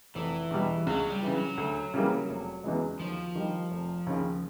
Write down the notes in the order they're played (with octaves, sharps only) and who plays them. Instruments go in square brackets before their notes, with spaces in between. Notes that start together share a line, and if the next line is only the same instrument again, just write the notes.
[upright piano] F1 [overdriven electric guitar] E3
[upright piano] E2 B2 G3
[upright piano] C#2 [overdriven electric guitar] F#3
[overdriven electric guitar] G3
[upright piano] C#3 E3
[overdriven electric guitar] F#3
[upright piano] D2
C#3 E3 G3 A#3
F1
E2 C#3 E3 G#3
[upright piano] D#2 [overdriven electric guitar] F3
[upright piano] D#3 G3
F1
D#2 C#3